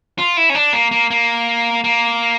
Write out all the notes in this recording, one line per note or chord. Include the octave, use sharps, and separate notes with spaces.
F4
E4
C#4
D4
A#3
A#3
A#3
A#3